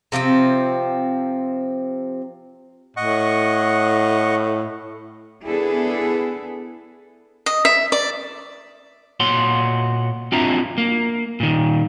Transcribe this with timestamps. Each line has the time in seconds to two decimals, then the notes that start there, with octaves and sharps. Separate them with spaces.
0.12 C3 F3 B3 C4
2.97 A2 D#5 F#5 C#6
5.45 B3 D4 E4 G#4 A4
7.46 D#5
7.65 E5
7.92 D5
9.20 A#2 F#4 C#5 F#5 C6
10.32 C4 D4 F4 F#4 E5 A#5
10.78 A#3
11.40 A#2 D#3